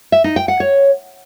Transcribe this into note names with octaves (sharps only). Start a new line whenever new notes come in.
E5
D#4
G5
F#5
C#5